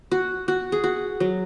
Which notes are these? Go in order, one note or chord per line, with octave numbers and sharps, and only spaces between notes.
F#4
F#4
G#4
F#4
F#3